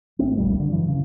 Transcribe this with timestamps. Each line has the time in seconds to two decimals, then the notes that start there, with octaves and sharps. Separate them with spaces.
0.19 G#1 F2 A3 C4
0.37 D1 A#1 F2 G3
0.60 D3
0.72 G2 E3 F#3
0.88 C#3